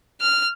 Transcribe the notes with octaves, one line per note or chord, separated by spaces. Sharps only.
F6